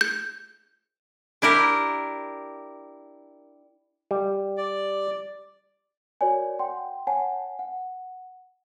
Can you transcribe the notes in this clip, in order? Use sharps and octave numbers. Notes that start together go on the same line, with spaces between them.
G6
D4 E4 G4 A#4
G3
D5
F#4 A#4 C#5 D5 G#5
F#5 G5 C6
C#5 F#5 G#5 A5
F#5